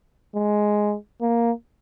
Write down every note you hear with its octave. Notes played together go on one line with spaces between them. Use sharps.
G#3
A#3